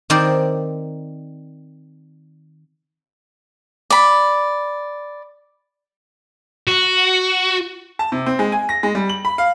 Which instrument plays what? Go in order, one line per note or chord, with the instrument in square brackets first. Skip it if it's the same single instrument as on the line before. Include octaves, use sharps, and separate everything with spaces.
[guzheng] D#3 C4 A#4 C5 D5
[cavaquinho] D5 B5
[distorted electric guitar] F#4
[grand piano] A5
C3
C4
G#3
G#5
A#6
G#3
G3
F#7
B5
F5